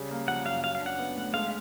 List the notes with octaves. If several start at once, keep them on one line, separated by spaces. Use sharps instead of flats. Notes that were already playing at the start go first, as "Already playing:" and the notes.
Already playing: C#3 G3
A#3
F3 F#5
F#2 F5
F#3 F5
F5
D4
F#5
B3
A2
G#3 F5